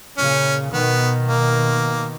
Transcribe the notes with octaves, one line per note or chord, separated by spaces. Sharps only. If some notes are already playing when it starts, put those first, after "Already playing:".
A#2 C#3 C#4
B2 D#3 B3
A#3